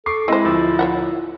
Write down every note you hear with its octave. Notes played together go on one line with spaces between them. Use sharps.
A4 C#6 D6 C7
G#3 C4 E4 C5
D1 F3 E6
C#5 E5 F#5